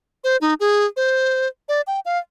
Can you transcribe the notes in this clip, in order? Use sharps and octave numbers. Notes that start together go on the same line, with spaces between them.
C5
D#4
G#4
C5
D5
G5
F5